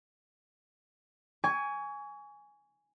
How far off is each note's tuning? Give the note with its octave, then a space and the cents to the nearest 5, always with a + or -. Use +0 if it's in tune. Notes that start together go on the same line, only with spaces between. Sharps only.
G#5 +0 C#6 +30